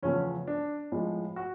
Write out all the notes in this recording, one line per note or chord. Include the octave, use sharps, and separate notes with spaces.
E2 C#3 F3 A3 C#4
D4
A2 F3 G#3
F#4